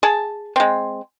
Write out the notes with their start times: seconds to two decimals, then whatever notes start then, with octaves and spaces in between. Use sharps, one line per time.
0.03 G#4 A5
0.56 G#3 C4